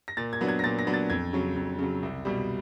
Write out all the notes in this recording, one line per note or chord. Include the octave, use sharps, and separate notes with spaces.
A#6
A#2 A6
G#6
F#3 B3 D4
G#6
A#6
A#2 A6
A#6
F#3 B3 D4
A6
F2 G#6
C#3 F#3
F2
C#3 F#3
C2
B2 G3